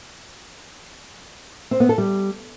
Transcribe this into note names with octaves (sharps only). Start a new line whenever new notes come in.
C4
B3
A4
G3